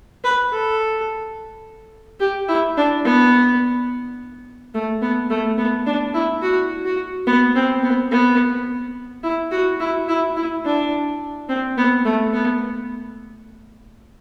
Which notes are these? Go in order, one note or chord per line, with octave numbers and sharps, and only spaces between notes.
B4
A4
G4
E4
D4
B3
A3
B3
A3
B3
D4
E4
F#4
F#4
B3
C4
B3
B3
E4
F#4
E4
E4
E4
D4
C4
B3
A3
B3